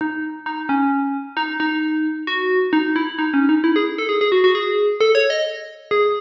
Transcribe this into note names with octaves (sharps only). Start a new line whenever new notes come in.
D#4
D#4
C#4
D#4
D#4
F#4
D#4
E4
D#4
C#4
D#4
E4
G#4
A4
G#4
G#4
F#4
F#4
G#4
A4
C#5
D#5
G#4